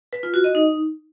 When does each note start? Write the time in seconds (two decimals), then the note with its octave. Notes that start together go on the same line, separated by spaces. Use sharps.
0.13 B4
0.23 F4
0.34 F#4
0.44 D#5
0.55 D#4